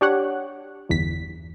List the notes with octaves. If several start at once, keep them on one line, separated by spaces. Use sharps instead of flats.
D4 G4 C#5 F#5
G1 E2 B6